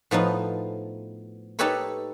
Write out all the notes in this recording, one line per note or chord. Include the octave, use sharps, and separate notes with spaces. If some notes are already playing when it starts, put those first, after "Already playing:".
A2 F3 B3 D#4
D#4 G4 A4 B4 C#5 B5